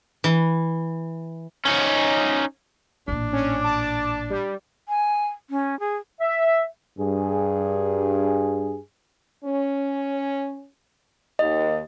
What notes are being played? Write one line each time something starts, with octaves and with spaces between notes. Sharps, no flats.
E3
C#4 D#4
A1 A#2 D4
C#4
A5 D6
G3
G#5
C#4
G#4
E5
G2 G#4
C#4
D#2 D#5